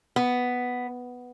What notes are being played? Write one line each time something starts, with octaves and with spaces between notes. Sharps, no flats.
B3